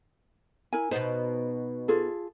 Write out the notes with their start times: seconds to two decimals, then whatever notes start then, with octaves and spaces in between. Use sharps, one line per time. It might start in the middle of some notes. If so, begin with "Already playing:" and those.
0.73 E4 A#4 G#5
0.91 B2 B3 D#4 C5
1.88 F4 G#4 A4